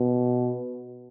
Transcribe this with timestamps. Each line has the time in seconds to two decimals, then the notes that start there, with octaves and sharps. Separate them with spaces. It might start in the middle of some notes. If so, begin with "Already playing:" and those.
Already playing: B2